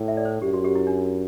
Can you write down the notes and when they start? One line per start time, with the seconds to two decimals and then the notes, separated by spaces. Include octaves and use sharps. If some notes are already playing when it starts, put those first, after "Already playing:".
Already playing: A2
0.08 E5
0.17 D5
0.25 C5
0.42 F#2 G4
0.54 F#4
0.64 G4
0.75 E4
0.87 D4